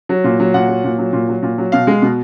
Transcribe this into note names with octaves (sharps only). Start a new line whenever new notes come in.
F#3
A#2
F#3
A#2 F#5
F#3
A#2
F#3
A#2
F#3
A#2
F#3
B2 F5
G#3
B2